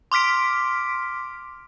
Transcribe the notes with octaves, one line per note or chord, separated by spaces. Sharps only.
C6 D6 F6 B6 D7